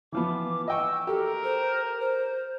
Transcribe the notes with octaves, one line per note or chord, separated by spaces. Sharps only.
E3 F3 B3 D6
D#5 G5 C#6 E6
G4 A4 A#4
C5
C5